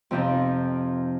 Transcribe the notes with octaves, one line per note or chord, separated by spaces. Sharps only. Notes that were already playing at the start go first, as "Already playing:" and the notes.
F2 C3 F3 C4 D#4